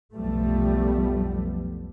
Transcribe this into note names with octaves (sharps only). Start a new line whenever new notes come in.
B1 F2 F3 G3 A3 B3